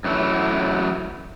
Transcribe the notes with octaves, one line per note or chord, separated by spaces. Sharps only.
F#2 E3 F#3 A3 E4